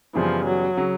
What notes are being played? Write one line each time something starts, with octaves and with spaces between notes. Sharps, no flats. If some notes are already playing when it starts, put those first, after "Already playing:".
F#2 C#3 E3 F3 G3 B3
F#3
C#3 F#3